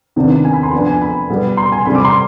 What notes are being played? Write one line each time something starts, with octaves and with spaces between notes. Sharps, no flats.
C3 D#3 B3 D4
G#5
B5
C6
F3 B3 D4 G#5
G#5
B5
B2 G3 B3
C6
G#5
C3 G3 C4 B5
D6
C6